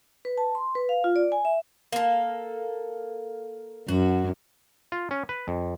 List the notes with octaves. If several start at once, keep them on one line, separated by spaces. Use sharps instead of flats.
B4
A5
C6
B4
F5
F4
D5
G#5
E5
A#3 A4
F#2 F#4
F4
C#4
B4
F2